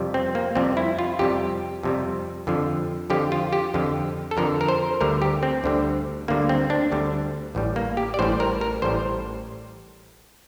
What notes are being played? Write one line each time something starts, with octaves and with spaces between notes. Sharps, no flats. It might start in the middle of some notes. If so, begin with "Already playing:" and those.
Already playing: F2 C3 G3
C4
A#3
F2 C3 G3 C4
E4
F4
F2 C3 G3 G4
F2 C3 G3
F2 D3 F3
F2 D3 F3 G4
F4
G4
F2 D3 F3
A4
F2 D3 F3 A#4
A#4
C5
D2 D3 G3 A#4
G4
C4
D2 D3 G3
D2 D3 G3 A#3
C4
D4
D2 D3 G3
A1 A2 G3
A#3
G4
D5
A1 A2 G3 C5
A#4
A#4
A1 A2 G3 C5